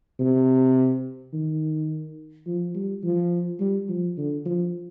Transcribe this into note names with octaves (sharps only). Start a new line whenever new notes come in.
C3
D#3
F3
G3
F3
G3
F3
D3
F3